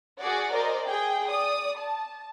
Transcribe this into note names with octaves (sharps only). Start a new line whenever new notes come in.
F#4 G#4 D5 F#5
A#4 C5 D5 D#5
G#4 G5
D5 D#6
A5